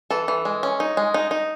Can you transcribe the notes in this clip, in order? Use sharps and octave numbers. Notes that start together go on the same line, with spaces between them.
E3 A4
E3
G#3
C#4
D#4
G#3
D#4
D#4